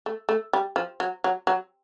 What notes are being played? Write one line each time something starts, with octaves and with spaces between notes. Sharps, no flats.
A3
A3
G3
F3
F#3
F#3
F#3